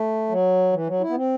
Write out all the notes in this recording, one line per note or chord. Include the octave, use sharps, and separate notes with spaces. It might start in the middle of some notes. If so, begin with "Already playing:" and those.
Already playing: A3
F#3
E3
F#3
E4
B3
C4